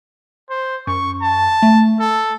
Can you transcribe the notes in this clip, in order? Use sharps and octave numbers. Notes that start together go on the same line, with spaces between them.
C5
F#2 C#6
A5
A3
A4